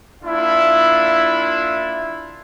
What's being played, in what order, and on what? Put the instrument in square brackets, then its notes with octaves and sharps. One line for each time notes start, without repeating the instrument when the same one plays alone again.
[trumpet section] A#3 D4 E4 F4 E5